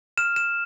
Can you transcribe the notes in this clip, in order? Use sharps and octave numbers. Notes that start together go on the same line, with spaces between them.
F6 E7
E7